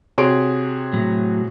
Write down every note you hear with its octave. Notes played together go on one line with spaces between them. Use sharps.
C3 F#4 G#4 C#5 C6 D7
A2 F#3